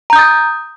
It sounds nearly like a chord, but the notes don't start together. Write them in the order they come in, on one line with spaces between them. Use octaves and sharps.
A#5 G6 D#6 A6